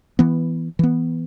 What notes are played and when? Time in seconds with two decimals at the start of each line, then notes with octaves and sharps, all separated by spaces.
0.19 E3 B3
0.79 E3 B3